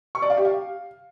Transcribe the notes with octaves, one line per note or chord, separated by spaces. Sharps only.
C#6
D5
F5
G4
F5